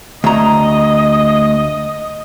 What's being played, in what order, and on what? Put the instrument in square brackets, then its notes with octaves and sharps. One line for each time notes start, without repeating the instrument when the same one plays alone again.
[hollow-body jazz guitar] D2 A#5 [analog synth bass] A3 [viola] D#5